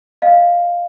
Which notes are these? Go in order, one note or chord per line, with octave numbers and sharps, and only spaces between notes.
D#5 F5